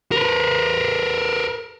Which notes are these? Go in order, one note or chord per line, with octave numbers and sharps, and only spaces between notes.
A#4 B4